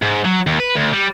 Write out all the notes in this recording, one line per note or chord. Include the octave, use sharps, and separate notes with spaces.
G#2
F#3
D#2
B4
D2
G3